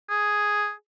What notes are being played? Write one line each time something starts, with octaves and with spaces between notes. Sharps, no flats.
G#4